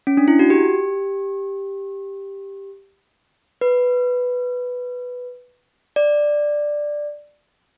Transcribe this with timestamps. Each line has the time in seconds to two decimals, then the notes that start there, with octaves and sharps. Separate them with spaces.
0.07 C#4
0.17 D4
0.28 E4
0.39 F#4
0.50 G4
3.61 B4
5.96 D5